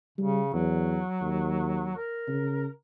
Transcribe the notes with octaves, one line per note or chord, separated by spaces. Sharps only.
C#3 G3
E2 F#3
D#2
A#4
C#3